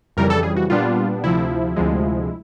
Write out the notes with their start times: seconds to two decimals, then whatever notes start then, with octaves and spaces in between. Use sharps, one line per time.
0.17 F2 C#3 E3 G3 A#4
0.30 A4
0.43 G#4
0.56 F#4
0.70 A#2 G3 B3 D4 F4
1.24 D2 C3 F3 E4
1.76 D2 C3 F3 G#3